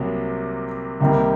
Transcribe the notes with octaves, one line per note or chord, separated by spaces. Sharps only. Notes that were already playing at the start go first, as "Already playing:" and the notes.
Already playing: C2 C3 F#3 A#3
C2 C3 D#3 G3 A#3